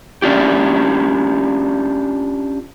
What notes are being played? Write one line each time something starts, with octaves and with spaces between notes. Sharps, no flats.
C#4 D4 F4 G4